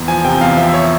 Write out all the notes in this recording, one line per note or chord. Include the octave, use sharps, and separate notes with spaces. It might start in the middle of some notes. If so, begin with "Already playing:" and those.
Already playing: E2
F3 G#5
C3 G5
E2 F5
F3 E5
E5
C#5